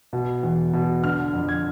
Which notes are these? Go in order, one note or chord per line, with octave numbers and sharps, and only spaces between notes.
B2
E2
B2
D3 F6
F2
G#6